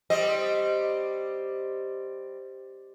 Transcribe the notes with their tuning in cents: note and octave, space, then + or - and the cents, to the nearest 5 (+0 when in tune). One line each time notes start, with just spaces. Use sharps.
G3 +0 C4 +0 D#5 +0